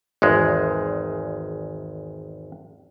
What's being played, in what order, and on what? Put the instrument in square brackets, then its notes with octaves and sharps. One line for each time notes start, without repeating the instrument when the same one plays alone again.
[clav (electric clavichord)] G#1 E2 G#3